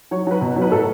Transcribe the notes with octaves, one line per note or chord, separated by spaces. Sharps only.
F#3 C#5
F#3 B4
B2
F#3
B4
A2 A4